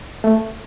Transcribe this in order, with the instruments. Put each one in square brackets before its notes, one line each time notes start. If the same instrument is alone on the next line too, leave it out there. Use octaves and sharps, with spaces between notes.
[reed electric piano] A3